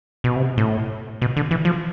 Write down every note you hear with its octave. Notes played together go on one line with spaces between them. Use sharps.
B2
C3
A2
B2
D3
E3
F3